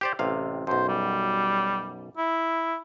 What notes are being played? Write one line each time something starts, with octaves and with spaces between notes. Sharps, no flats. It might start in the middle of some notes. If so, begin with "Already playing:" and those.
G4 C5 D5
A1 C3 F5
B1 F#2 C5
G3
E4